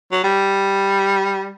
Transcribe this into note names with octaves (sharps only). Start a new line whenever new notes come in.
F#3
G3